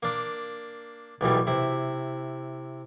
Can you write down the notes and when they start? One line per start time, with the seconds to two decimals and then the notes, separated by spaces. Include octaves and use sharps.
0.03 A#3 D4
1.21 B1 A#2 E3 G3
1.47 C3 E4